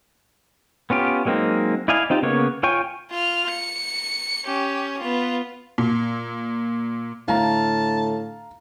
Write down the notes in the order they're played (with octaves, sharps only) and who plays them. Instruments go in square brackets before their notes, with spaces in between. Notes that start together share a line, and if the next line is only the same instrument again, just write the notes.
[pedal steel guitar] B3 C#4 F4 G4
F#3 G#3 A#3 C4 D#4
E4 D5 D#5 F5 G#5
C4 D#4 F4 G4
C#3 A#3 B3 C#5
F4 C#5 G5 G#5 C#6
[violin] F4 F6
C#7
C#4 G4
B3 F4
[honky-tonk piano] A#2
[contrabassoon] A2 [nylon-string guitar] D3 A3 E4 [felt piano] F5 A#5 [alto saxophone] A5